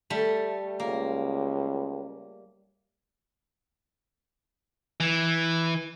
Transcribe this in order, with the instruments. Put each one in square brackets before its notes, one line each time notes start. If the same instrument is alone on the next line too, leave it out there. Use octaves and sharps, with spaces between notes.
[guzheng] G3 A3
[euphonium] C#2 [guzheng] A#3
[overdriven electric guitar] E3